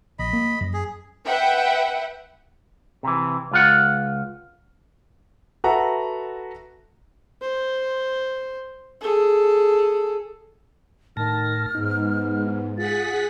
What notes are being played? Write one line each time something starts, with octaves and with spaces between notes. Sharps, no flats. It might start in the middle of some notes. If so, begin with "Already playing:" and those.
A#1 D#5 B5
A#3
F#2
G#4
B4 E5 F#5 G5
C3 E3
C#2 F4 F#5
F#4 A4 B4 E5 F#5 A#5
C5
G#4 A4
A2 D#3 A5 F6 A#6
G#2 B3 D#4
F4 G#4 F#5 A6 B6